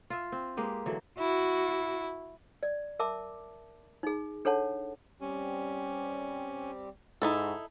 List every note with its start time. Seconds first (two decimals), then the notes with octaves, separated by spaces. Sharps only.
0.10 F4 E5
0.32 C4
0.57 G#3 A#3 G4 B4
0.86 D3 E3 F#3
1.19 E4 F#4
2.63 D5
2.99 A#4 E5 A5 D6
4.03 D#4 G#4
4.45 D4 A4 C#5 F#5 A5
5.21 G3 C4 C#4 G4
7.22 G#2 D#4 E4 A4